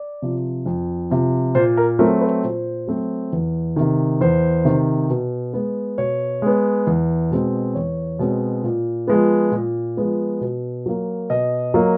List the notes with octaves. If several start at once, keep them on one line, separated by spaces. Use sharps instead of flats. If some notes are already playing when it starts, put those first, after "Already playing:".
Already playing: D5
C3 F3
F2
C3 F3
A#2 C5
A#4
F#3 A3 C4 A#4
B4
A#2 C5
F#3 A3 C4
E2
C3 D#3
E2 C5
C3 D#3
B2
G#3 B3
B2 C#5
G#3 B3
E2
B2 G#3 C4
E2 C#5
B2 G#3 C4
A#2
F3 G#3 B3
A#2
F3 G#3 B3
B2
F#3 A#3
B2 D#5
F#3 A#3